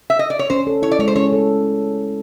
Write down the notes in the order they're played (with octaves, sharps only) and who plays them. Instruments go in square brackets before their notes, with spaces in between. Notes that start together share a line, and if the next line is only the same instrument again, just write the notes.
[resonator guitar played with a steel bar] E5
D#5
D5
C#5
[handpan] C#4 [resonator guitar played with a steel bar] C5
[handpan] A4
[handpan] E4 [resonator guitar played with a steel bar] C#5
[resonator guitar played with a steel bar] D5
[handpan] G#3 [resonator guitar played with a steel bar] C#5
[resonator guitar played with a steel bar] C5
[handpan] C#4 [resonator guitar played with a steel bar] C#5
[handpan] A4